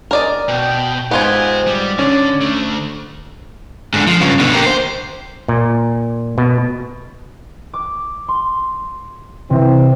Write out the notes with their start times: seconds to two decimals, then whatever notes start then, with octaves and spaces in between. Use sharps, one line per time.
0.11 A#4 D5 D#5
0.48 B2 G5
1.11 G#2 B3 F4 G4 B4 C5 G#5
1.67 G3 D5
1.99 D3 C#4
2.41 D3 A3
3.93 G#2 D3
4.07 F3
4.20 G2 C#3
4.39 B2 D3
4.53 A#3 G4
4.66 C5
5.48 A#2
6.38 B2
7.74 D6
8.28 C6
9.50 C3 E3 C4